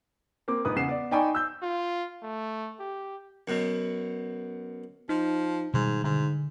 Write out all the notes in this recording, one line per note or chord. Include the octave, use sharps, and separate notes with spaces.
A#3 C4 D6
A#1 G#2 B4 D#6
E2 C#3 F#5 C7 E7
B3 D5
D#4 D5 G5 G#5 B5 C#6
E6 G6
F4
A3
G4
F#2 B2
F3 D#4
G#2 B2 D#3 G3
G#2 D3